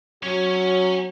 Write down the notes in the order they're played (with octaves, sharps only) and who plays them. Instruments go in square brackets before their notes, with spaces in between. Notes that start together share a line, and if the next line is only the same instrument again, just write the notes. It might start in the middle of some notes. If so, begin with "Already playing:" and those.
[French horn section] F#3 [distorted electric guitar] C#4 C#5